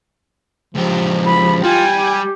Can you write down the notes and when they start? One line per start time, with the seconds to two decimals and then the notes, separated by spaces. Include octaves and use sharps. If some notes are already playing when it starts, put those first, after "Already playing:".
0.75 C#2 F3 G4
1.27 B5
1.63 G3 F4 G5 G#5
1.95 G4